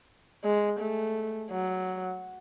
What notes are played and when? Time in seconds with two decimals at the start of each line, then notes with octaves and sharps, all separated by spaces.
0.44 G#3
0.80 A3
1.51 F#3